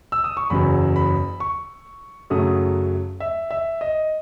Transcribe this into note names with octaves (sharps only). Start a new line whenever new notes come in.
E6
D#6
C#6
F#1 E2 C#3 F#3 B5
B5
C#6
F#2 C#3 F#3 A3 D#6
E5
E5
D#5